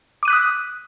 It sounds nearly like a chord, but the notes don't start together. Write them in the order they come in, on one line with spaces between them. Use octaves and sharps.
D6 D#7 F#6 B6 D#6